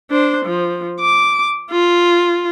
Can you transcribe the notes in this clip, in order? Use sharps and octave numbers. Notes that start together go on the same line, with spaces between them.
D4 C5
F3
D6
F4